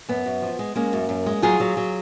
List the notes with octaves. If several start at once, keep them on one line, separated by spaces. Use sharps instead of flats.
F#2 B3
F#2
F3
G#3
G#3 A#3 C#4
F#2
F#2
G#3
F#3 F4 G#4
F#3
F#3